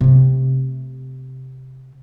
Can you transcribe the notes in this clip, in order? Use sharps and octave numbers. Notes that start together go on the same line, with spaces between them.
C3 A3